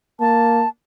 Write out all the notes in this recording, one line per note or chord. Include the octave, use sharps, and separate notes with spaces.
A#3 A5